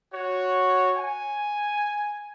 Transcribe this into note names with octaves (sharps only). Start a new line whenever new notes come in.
F#4 C#5
G#5